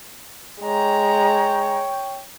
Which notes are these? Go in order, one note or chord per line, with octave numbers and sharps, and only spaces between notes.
G#3 C#5 G5 A#5